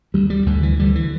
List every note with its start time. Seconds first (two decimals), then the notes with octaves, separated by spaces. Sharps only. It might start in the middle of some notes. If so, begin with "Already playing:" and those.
0.14 D2 G3
0.30 G3
0.46 D2 D3
0.63 E3
0.79 D3 G3
0.95 E3